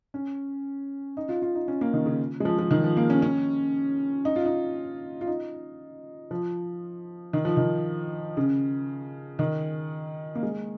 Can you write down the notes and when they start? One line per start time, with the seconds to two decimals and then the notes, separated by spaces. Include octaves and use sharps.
0.14 C#4
1.17 D#4
1.29 F4
1.42 F4
1.55 D#4
1.68 C#4
1.81 A#3
1.93 D#3
2.06 C#3
2.40 G#3
2.45 F3
2.58 F3
2.71 D#3
2.84 F3
2.97 A#3
3.10 C#4
3.22 C#4
4.25 D#4
4.36 F4
4.45 D#4
5.21 F4
5.27 D#4
6.31 F3
7.33 D#3
7.45 F3
7.57 D#3
8.37 C#3
9.39 D#3
10.35 A#3
10.43 G#3